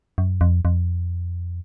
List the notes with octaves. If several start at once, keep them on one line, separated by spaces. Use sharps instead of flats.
F#2
F2
F2